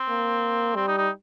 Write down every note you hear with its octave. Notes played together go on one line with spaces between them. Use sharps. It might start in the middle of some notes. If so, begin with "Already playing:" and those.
Already playing: C4
A#3
G3 C4
D#4
D#4